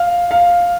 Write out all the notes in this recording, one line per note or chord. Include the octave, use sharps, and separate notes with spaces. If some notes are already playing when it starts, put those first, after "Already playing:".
Already playing: F5
F5